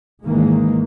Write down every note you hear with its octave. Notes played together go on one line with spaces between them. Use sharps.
G#1 D#3 E3 G#3 A#3